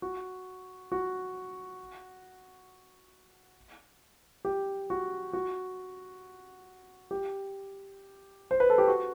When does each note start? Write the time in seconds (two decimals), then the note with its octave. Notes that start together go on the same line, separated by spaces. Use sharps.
0.02 F#4
0.92 F#4
4.45 G4
4.90 F#4
5.33 F#4
7.11 G4
8.51 C5
8.60 B4
8.70 A4
8.78 G4
8.88 F#4